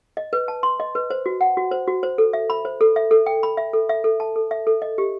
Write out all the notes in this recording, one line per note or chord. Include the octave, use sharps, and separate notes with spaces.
D#5
B4
A5
C6
D#5
B4
C5
F#4
F#5
F#4
C5
F#4
C5
A4
E5
B5
C5
A4
E5
A4
G5
B5
E5
A4
E5
A4
A5
A4
E5
A4
D#5
G4